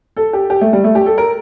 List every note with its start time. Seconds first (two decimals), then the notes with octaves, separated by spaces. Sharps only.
0.17 A4
0.33 G4
0.50 G4
0.61 A3
0.73 G3
0.84 A3
0.95 G4
1.06 A4
1.18 A#4